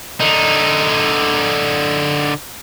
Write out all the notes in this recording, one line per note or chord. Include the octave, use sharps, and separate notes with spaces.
D3 D#4